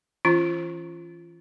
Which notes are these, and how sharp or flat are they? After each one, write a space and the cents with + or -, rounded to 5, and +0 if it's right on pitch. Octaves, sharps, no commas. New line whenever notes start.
E3 +0 C#4 +0 F4 -25